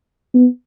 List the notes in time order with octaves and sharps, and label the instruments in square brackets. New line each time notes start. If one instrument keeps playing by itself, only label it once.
[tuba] B3